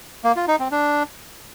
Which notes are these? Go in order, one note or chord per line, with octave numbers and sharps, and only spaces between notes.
A#3
F4
D#4
C4
D4